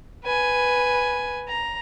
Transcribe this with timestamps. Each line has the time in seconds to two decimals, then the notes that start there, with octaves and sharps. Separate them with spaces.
0.24 B4 G#5
1.48 A#5